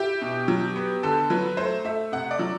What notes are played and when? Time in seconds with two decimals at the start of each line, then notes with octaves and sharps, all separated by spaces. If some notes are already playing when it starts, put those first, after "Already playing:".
Already playing: E4 G4
0.22 B2
0.48 F#3
0.76 B3
1.03 D3 A4
1.30 F#3 B4
1.57 A3 C5
1.85 A3 E5
2.12 C3 F#5
2.31 D5
2.39 F#3